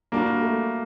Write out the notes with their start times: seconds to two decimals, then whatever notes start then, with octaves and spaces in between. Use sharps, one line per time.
0.12 G3 A#3 D4 F#4
0.41 A3